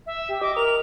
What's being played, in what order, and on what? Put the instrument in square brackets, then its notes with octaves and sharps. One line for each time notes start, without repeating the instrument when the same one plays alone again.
[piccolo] E5
[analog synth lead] G4
[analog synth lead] D#5 [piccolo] D6
[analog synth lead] A#4 [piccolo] F7